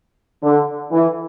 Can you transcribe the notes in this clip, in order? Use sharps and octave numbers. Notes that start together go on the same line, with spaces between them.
D3
E3